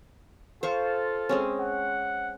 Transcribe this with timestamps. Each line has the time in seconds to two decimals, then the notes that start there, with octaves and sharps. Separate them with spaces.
0.63 F4 A4 C5 F5 C#6
1.29 G#3 C4 C#4
1.60 F#5